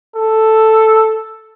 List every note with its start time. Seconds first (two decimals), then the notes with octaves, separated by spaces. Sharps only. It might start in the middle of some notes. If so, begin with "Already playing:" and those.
0.16 A4